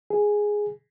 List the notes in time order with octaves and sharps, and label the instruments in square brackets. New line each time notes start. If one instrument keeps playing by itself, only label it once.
[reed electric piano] G#4